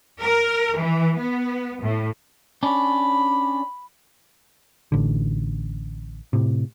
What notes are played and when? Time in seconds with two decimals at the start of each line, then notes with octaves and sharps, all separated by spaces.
0.21 A#4
0.76 E3
1.17 B3
1.82 A2
2.63 C#4 D4 B5
4.92 A1 D3
6.33 A2 C3